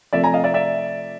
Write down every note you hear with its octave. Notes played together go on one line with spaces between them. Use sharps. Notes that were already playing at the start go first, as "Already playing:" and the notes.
C3 F3 A3 D5 E5
G#5 A#5
D#5 F5
D5 E5
D5 E5